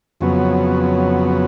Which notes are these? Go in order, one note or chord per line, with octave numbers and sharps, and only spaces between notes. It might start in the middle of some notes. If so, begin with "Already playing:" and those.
F2 C#3 F#3 B3